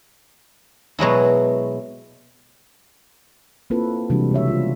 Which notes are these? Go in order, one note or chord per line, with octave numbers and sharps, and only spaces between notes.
B2 F#3 G#3 E4
A#3 C4 E4 F4 A4 B4
C3 E3 G3 G#3 D4 F#4
C#3 E3 C#5 E5
G#3 B3 F4